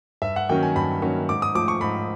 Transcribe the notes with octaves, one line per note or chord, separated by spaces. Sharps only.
G2 E5
F#5
D#3 F#3 A#3 C#4 G5
G#5
G2 B5
D#3 F#3 A#3 C#4
G#2 D6
D#6
F3 A3 D6
C#6
G#2 B5